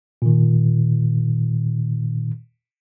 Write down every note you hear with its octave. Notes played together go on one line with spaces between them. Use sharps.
A#2 D#3